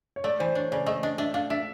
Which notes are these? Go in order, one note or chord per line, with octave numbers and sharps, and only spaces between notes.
C#5
A3 D5
E3 C5
D4 C#5
C#3 D5
A3 D#5
D4 D#5
D4 E5
D4 F5
D4 E5